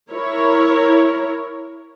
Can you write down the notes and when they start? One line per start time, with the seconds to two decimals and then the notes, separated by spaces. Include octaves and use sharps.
0.12 E4 A#4 C#5